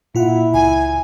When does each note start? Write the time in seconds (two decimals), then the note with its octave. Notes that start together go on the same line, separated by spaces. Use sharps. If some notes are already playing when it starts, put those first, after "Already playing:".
0.15 A#2 E4 F4 F#5
0.54 C#2 G#5